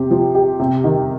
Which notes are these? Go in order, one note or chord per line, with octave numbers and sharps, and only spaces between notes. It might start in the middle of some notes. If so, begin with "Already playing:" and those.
Already playing: C3 G4
F3
G4
C3
D#3